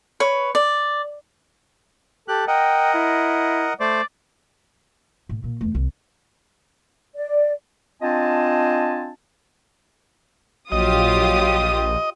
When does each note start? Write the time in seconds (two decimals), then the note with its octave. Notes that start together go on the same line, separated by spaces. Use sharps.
0.20 B4 C#5
0.55 D5
2.28 G4 A4 F#6
2.47 A#4 D#5 F#5 G5
2.94 E4
3.80 A3 C5 D5
5.29 A2
5.44 A#2
5.61 E2 A3
5.75 C2
7.15 D5
8.02 C4 D4 F4 D#5 G#5 A5
10.72 A#1 F#3 F4 G4 D#5 D#6